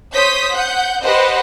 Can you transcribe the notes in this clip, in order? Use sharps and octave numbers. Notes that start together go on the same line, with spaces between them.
C5 C#5 D#6 G6 B6
F#5 G6
G4 B4 C5 D#5 F#5